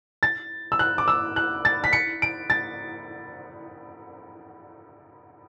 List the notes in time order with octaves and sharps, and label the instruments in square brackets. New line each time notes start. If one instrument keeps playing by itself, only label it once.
[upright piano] A6
E6
F#6
D6
E6
F#6
A6
B6
C#7
D7
A6